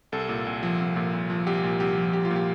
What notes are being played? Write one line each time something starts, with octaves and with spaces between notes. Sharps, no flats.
C2 A4
A#2
C2
F3
C2
A#2
C2
F3
C2 G4
A#2
C2 G4
F3
C2 G4
F4
A#2
G4